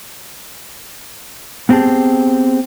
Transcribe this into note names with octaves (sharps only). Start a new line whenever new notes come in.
B3 C4 G4 G#4 A5